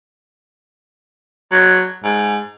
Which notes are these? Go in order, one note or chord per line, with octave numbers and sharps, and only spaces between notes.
F#3
G#2